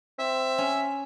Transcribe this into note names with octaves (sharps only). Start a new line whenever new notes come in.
C4 E5
C#4